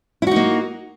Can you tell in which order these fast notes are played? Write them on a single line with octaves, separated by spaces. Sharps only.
E4 F#4 D#4 A#3